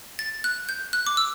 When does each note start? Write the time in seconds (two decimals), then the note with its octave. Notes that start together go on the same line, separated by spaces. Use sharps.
0.19 A6
0.44 F#6
0.69 G6
0.93 F#6
1.07 D6
1.17 E6